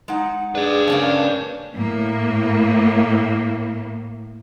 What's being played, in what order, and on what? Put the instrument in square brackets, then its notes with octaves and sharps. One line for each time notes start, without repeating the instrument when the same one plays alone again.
[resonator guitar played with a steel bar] G#3 D#4 F#5
[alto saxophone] D4 [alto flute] G#4 [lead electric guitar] B4 D5
[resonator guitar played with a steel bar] C#3 A3 A#3 [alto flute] C#4
[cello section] A2 A#3